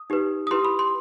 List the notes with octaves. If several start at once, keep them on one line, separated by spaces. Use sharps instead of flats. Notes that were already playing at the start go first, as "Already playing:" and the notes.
Already playing: D#6
D#4 G4 B4
D#6
E4 G4 B4 C6
B5
C6